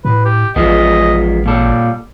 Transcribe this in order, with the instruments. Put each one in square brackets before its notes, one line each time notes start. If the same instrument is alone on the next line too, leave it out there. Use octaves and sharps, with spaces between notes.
[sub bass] A2 [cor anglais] B4
[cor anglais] G4
[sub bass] A1 [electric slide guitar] F3 G#3 B3 [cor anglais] D#5
[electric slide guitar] A#2 A4 [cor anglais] G3